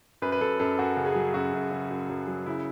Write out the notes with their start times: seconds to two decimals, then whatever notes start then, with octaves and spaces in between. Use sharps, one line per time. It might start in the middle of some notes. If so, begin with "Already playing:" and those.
0.22 F#2 B4
0.32 B4
0.41 F#2 A4
0.59 F#2 A4
0.79 F#2 F#4
0.97 C#3
1.06 G#4
1.15 F#3
1.34 F#2 F#4
1.53 F#2
1.71 C#3
1.91 F#2
2.09 F#2
2.28 F#3
2.46 C#3 E4